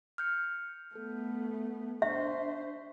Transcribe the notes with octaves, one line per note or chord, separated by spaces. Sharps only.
F6 G6 C#7
A3 B3 A4
D4 C5 E5 C#6 B6